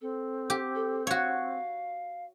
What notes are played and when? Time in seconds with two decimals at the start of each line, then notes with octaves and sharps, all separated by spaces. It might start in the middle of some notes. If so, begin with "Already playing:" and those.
0.01 C4 A4
0.50 G4
0.75 A4
1.07 F#4 C#5 F5